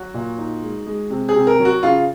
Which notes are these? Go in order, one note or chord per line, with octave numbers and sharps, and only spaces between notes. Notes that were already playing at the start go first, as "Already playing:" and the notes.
Already playing: F#3 F#4
A#2
D#4
G#3
G#3
C3
G#4
C3
A#4
F#3
F#4
C#3 F4